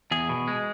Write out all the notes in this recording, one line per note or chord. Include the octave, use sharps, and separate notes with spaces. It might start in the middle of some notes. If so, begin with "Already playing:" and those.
E2 G#4
B2
G#3